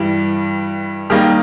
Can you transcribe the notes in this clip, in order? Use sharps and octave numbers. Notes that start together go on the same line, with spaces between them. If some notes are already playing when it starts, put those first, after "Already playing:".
Already playing: G2 E3 G3
D#3 G3 A#3 D#4